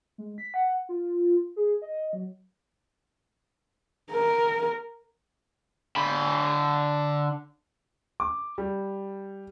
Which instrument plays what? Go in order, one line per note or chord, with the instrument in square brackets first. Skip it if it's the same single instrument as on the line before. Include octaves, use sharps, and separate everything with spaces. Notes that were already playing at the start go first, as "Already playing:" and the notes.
[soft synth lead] G#3
B6
F#5
F4
G#4
D#5
F#3
[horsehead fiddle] A#4
[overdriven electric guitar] D3 B5
[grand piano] D6
G3